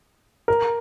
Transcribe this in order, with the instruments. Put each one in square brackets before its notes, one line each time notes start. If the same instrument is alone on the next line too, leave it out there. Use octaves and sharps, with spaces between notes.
[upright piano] A#4